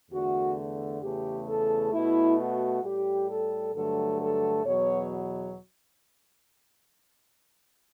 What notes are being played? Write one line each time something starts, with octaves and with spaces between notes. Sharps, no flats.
E2 D3 A3 F#4
E2 C#3 E3 A3 G4
A4
B2 A3 E4
F#4
A2 G3 G4
A4
G2 D3 F#3 A3 A4
A4
E2 B2 F#3 C#5